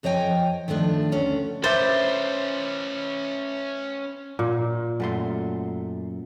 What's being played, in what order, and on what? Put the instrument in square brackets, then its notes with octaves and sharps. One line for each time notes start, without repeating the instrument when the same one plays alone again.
[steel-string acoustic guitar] F2 F3 C#5 D#5 G5 G#5
D#3 F3 A3 D4
D2 C#4 D4
[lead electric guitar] C#4 B4 [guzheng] C5 [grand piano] E5 D6 A6
[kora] A#2
[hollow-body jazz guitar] F#2 A3 C6